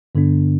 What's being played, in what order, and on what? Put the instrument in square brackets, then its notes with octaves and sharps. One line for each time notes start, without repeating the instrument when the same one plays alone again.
[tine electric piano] G2 D3 B3 D4